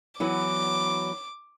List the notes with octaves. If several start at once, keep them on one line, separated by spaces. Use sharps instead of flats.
E3 F#3 B3 D6